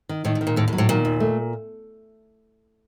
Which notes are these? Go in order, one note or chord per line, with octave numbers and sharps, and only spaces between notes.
D#3
A2 D#3
A2
D#3
A#2
D#2 A2
A2
F#3
A2
A#2 D#3
D#2
A3